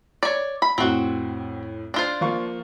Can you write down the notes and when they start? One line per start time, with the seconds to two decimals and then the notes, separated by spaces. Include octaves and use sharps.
0.23 C#5 D5
0.62 B5
0.78 F2 A2 C4 F#4
1.94 D4 F4 C5
2.21 F3 A#3 C#6